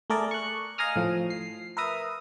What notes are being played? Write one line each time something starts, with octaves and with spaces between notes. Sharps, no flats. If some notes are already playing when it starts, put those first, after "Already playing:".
A3 G#4 A#4 D5
C#6 F#6
D#5 F5 G#5 A#5 D#6 F6
A2 F3
C7
A#4 B4 E5 A#5 D#6